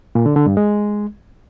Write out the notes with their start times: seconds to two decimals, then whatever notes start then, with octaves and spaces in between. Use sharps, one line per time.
0.15 A#2
0.26 D3
0.36 D3
0.47 G2
0.57 G#3